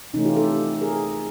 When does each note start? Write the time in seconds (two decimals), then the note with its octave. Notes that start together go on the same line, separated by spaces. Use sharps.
0.14 C3 E3 A3 C#4 D#4
0.25 F4 G4
0.36 G4 A4
0.81 G#4 A#4